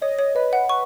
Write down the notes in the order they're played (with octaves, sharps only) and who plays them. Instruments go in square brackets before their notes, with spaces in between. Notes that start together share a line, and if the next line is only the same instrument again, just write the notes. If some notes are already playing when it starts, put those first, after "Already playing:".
[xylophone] C#5 [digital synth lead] D#5
[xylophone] C#5
[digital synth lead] B4 [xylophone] D#5
[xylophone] F#5
[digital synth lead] B4 [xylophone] C#6